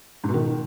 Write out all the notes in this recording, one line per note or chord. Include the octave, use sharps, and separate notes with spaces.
G#2
B2
D#3